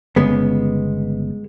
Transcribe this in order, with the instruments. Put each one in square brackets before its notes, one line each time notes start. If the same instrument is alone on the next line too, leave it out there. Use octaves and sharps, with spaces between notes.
[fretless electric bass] G1 C#3 [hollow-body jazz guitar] G#3 B3